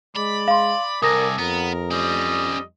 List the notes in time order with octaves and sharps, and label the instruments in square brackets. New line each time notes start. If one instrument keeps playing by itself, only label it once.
[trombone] G#3 [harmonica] D5 [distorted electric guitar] B5
[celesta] F5 C6
[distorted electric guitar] C2 [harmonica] A4 D5 G#5 [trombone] A#4 [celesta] D#6 A#6
[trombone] F2 [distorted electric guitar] B3 [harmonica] A#4
[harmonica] G3 D#5 [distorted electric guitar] C#4 C5